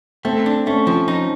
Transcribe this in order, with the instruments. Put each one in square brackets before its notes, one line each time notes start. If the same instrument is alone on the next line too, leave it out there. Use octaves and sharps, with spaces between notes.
[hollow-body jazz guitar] A3 [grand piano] C4
[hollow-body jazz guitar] D4
[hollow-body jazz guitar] A3 [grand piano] C#4
[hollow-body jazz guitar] F3
D#4